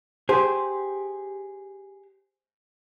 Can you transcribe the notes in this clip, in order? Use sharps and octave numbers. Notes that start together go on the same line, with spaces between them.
G4 G#4 C5